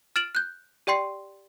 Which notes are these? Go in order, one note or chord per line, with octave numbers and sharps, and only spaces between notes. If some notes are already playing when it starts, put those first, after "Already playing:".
F6 A6 D7 E7 F#7
F#6 G6
G4 D5 G5 C6 C7